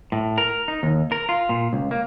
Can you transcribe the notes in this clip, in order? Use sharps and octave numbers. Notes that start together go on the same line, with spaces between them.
A2
A#4
D#4
D#2
A#4
F4
A#2
C#2
A#3